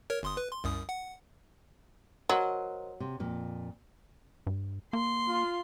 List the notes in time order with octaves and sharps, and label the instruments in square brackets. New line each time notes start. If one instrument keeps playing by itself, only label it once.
[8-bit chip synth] A#4 C#5
G1 C6 D#6
B4
C6
C2 F#2 D#6
F#5
[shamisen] F#3 [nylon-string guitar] A#4 C5 D#5
[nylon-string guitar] C3
F2 A#2
[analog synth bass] G2
[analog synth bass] A#3 [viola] C6
[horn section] F4